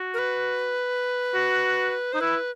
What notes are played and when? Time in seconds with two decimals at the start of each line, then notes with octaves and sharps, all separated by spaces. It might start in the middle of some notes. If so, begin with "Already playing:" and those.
Already playing: F#4
0.14 A#4
0.19 B4
1.35 F#4
2.13 D#4 C5
2.21 E4 B4